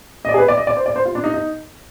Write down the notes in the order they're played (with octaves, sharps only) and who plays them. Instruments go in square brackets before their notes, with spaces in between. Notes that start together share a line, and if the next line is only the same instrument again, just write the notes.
[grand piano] D#5
D5
G#4
B4
D5
D#5
D5
C5
D5
C5
F4
D4
D#4
D#4